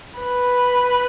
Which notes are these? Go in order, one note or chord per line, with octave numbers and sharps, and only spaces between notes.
B4